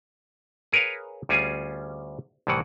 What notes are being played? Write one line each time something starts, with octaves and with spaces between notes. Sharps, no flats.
G#4 A#4 B4 C#5 F5
D2 G3 C#4 F4 G#4 G#5
C2 A2 D#3 E3 F#5